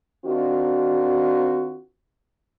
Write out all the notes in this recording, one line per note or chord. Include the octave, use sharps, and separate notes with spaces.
D#3 C4 D4 F4 F#4